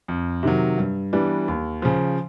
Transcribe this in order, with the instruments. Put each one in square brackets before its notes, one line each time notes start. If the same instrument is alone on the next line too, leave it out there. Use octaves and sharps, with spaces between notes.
[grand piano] F2
C3 D#3 F#3
G2
E3 G3 B3 D4
D#2
C#3 F3